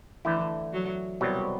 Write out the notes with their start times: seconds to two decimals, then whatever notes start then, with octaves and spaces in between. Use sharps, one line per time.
0.25 D3 E3 A3 E4
0.73 F#3
1.21 C2 B2 F#3 G3 C4